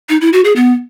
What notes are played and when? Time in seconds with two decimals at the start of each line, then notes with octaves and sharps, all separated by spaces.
0.09 D#4
0.21 E4
0.33 F#4
0.45 G#4
0.56 B3